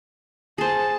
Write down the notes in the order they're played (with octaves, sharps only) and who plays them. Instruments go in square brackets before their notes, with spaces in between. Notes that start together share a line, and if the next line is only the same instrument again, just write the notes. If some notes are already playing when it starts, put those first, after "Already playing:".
[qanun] G#4 C5 [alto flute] G#5 [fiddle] A5